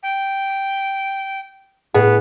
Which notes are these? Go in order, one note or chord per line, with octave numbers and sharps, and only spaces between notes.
G5
A2 B3 G#4